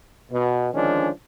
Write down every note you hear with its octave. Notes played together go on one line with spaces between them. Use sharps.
B2
D3 D#3 F3 G#3 C#4 D4